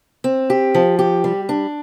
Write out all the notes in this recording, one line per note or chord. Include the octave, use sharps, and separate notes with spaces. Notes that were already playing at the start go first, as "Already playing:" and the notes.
C4
G4
F3
G4
G3
D4